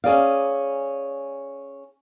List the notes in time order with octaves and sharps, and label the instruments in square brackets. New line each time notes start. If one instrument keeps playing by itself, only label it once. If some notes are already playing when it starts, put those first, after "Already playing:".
[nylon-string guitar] C#4 G#4 D5 F5